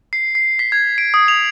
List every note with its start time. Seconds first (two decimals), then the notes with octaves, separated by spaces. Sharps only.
0.13 C7
0.35 C7
0.59 B6
0.72 G#6
0.98 D7
1.14 D#6
1.28 F7